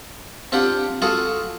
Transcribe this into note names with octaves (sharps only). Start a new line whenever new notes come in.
C4 D4 F4 G4 F#5 G5
F4 F#4 G#4 A4 F#5